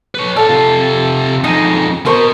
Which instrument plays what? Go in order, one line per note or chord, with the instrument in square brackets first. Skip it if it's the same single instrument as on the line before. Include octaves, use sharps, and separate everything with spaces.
[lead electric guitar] B4 C#5
[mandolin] A4 [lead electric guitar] D5 F5
[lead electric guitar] C3 F4
[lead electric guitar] F2 G#3 [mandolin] D#4
[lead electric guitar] B2 [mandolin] A#4 C5 C#6